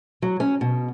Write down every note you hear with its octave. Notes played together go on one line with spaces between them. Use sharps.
F#3
C#4
B2